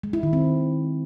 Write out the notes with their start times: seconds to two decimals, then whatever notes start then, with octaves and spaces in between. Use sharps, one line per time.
0.03 G#3
0.13 E4
0.23 D#3
0.33 C4